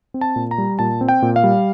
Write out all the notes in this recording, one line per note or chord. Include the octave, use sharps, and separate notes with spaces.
C4
A5
A#2
A#5
G3
A#2 A5
C4
G5
A#2
F5
G3